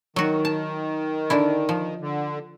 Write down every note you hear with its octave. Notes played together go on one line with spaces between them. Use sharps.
D#3 F#3 F#4
A5
D3 D4 E4
F3
D3